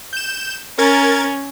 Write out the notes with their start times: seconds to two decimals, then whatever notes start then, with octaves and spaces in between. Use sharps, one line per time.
0.13 G6 E7
0.79 C#4 A#4 G#6 A6